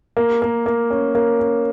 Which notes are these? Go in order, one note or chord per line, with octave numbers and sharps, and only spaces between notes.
A#3
A#3
A#3
C#4
A#3
C#4